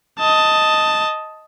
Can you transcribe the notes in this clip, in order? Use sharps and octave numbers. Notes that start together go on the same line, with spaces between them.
D#5 A5